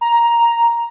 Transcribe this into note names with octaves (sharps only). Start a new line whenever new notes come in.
A#5